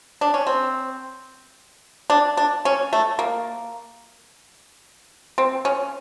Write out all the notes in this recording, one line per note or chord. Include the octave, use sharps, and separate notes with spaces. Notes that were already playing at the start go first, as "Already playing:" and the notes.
D4
C#4
C4
D4
D4
C#4
A3
A#3
C4
C#4